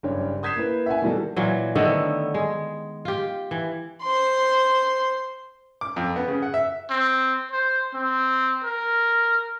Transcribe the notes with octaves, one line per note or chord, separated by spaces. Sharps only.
F#1 G2 D4 C#5
D#6 G6 G#6 B6 C7 E7
A#3 E4 B4
E5 F#5 G#5
B2 D#3 G3 F#4 A4
A#2 E3 F#3
D3 D#3 A3 B3
G#3
F4 G4
E3
C5 C6
D6
F2
B3
C#3
F#5
E5
C4
C5
C4
A#4